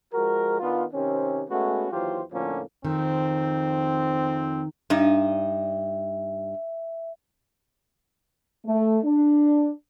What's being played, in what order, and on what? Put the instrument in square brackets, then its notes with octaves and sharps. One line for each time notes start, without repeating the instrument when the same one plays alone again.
[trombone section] F3 G#3 F#4 A#4
D#3 B3 D4 F4
C3 D#3 C4 C#4
G#3 A3 B3 C#4 F#4
D#2 E3 F#3 F4 G4 C5
F2 A2 D3 F3 A#3 C#4
[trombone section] F2 C4 [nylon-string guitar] D#3
[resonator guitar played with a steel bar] G2 D#4 [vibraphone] E5
[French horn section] A3
D4